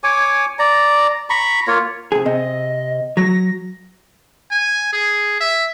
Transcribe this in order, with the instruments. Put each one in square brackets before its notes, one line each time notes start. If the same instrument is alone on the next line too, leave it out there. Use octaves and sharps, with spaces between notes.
[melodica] C#5 G#5 D6
D5 A#5
A#5 B5 C#6
A#3 F4 C#5
[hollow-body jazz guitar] C3 G#4
[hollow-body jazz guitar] C3 [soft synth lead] D#5
[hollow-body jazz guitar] F#3 [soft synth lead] A#6
[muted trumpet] G#5
G#4
E5